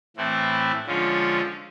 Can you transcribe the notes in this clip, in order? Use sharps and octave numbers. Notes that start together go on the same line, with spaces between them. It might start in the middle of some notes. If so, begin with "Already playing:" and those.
A2 E3 A3 C4 E4
D3 F3 G#3 C#4 F4